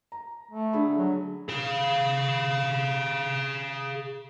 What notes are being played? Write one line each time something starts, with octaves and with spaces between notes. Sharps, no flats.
A#5
A3
D3 G#4 B5
F#3
G#4 F5